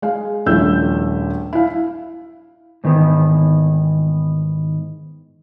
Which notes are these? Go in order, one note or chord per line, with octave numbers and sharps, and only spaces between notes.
G#3 G#4 F5
D#1 A#1 A3 E4 E6 G6
E4 F5
G#2 D#3 E3 B3